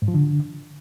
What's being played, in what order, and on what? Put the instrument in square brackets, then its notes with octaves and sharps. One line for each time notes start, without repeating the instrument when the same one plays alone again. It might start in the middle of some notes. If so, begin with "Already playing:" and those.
[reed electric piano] G#2
F3
D3